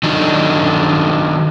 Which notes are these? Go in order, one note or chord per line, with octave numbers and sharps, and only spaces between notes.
D#3 F#3 D4 D#4